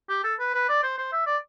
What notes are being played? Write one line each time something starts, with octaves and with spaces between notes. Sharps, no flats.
G4
A4
B4
B4
D5
C5
C5
E5
D5